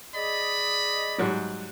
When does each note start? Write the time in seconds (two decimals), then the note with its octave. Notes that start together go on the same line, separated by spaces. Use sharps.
0.15 G#4 D5 D#5 B5
1.18 G#2 F#3 G3